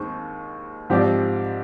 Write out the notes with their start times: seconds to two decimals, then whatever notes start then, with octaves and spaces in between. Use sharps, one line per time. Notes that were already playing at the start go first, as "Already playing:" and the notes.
Already playing: D#2 D#3 G#3 C4
0.90 G#2 F3 C4 G4 D5